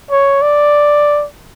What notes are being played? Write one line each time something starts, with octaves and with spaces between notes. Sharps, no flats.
C#5
D5